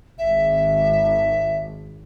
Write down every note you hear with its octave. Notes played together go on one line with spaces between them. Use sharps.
G#1 E5